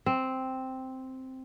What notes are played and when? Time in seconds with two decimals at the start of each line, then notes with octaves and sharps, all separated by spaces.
0.06 C4